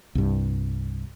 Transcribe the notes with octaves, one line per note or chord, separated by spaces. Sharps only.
C2 G2